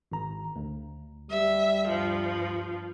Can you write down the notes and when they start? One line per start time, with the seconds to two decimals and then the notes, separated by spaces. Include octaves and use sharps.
0.12 G#1 A#5
0.56 D2
1.31 G3 E5
1.86 G2 F3